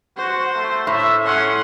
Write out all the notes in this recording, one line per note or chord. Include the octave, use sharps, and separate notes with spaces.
F#4 C5
A3
A2 E5
C#4 F#5 C6